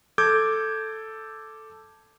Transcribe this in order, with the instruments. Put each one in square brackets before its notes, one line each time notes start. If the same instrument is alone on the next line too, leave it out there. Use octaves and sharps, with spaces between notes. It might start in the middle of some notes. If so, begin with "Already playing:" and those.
[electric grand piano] A4 D6 G6 G#6